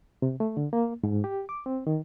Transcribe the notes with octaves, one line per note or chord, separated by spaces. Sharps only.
C3
A3
D3
A#3
G#2
G4
D6
C4
D#3